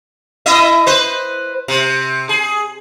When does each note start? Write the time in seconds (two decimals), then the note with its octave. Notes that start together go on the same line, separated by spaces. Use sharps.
0.46 E4 D#5 E5
0.86 B4 C5
1.68 C3
2.29 G#4